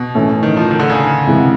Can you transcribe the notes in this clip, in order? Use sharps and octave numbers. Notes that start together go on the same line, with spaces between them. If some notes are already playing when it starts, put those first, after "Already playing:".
Already playing: B2
A2 E3 A3 C#4
D#3
F3
D#3
D3
C#3
C3 E3 G#3 B3